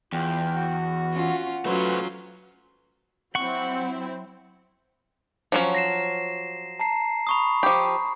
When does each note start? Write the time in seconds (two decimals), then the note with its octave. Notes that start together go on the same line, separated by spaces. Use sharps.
0.13 E2 F4 G5
0.56 F#4
1.13 C#4 F4 F#5
1.65 F#3 A3 C#4 F4 B4 C5
3.35 F#3 C4 E4 F#5 C#6
5.52 F3 F#3 C#4
5.75 A#6 C7 E7
6.80 A5 A#5 C7
7.27 B5 C#6 D#6
7.63 F3 G4